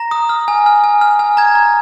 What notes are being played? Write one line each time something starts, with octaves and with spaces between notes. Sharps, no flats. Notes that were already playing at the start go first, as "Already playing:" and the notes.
Already playing: A#5 A#6
D#6
F6
G#5
F6
G#5
F6
G#5
A#5 G#6
A#5